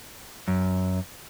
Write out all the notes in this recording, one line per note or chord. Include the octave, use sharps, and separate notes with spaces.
F#2